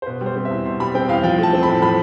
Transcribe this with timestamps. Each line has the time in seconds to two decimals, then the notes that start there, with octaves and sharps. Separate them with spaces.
0.02 C5
0.06 B2 B4
0.21 G3
0.26 C5
0.36 C4
0.45 E5
0.50 E2
0.65 B2 C6
0.80 G3 B5
0.95 C4 G5
1.09 E2 F5
1.23 F3 G5
1.38 A3
1.43 A5
1.53 C4
1.63 A2 B5
1.82 F3 B5